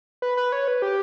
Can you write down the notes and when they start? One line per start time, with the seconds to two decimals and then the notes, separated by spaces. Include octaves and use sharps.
0.22 B4
0.37 B4
0.52 C#5
0.68 B4
0.82 G4